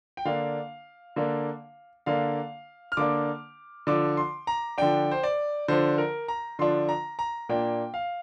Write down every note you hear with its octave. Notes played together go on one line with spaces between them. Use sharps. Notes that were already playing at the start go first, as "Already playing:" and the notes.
G5
D3 A#3 D4 F5
D3 A#3 D4
D3 A#3 D4 F5
F6
D3 A#3 D4 D6
D3 F3 D4 D6
C6
A#5
D3 F3 D4 G5
C5
D5
D3 F3 D4 C5
A#4
A#5
D3 F3 D4 C6
A#5
A#5
A#2 A#3 D4 G5
F5